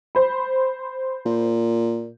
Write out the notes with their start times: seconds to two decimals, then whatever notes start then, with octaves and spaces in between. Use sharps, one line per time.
0.15 C5 B5
1.26 A#2